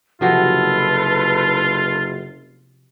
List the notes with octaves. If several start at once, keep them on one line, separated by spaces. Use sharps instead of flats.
F#1 C3 F3 F4 F#4 A4 B4